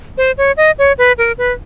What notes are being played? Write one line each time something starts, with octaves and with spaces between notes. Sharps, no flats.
C5
C#5
D#5
C#5
B4
A#4
B4